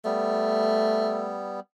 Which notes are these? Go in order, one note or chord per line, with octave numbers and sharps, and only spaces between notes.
G3 A3 B3